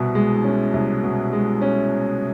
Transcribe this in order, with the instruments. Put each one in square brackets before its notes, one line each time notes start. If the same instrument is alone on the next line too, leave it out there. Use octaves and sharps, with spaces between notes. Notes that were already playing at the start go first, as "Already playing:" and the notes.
Already playing: [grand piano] C2 B2
G#3
C#4
C2
B2
G#3
C#4